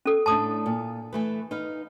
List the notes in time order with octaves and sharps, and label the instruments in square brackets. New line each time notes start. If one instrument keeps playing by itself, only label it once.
[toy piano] C#4 A4
[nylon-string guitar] A2 A3 D4 [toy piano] A5 D#6
[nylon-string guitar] A#2
E3 A3 B4
D#4 B4 F5